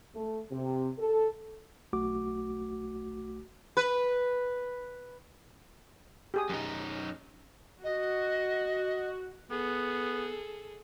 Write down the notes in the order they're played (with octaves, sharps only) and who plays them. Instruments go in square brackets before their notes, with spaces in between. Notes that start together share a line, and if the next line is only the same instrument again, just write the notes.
[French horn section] A3
C3
A4
[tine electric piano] B1 A3 F#4 D6
[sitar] B4
[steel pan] G4 G#4 D#6
[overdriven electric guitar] F#2 D#4
[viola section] F#4 [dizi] D#5
[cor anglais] B3 [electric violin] G#4 A4